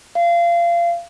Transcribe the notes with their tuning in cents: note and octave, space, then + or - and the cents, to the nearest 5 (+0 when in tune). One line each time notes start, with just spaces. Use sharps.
F5 -25